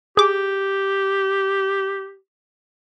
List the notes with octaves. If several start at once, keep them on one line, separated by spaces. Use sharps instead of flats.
G4 G#4 D6